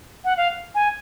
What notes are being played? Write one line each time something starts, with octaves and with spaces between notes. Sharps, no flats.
F#5
F5
G#5